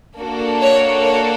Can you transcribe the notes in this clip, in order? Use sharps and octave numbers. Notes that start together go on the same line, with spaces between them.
A#3 D4 F#4 A4
C#5
C#5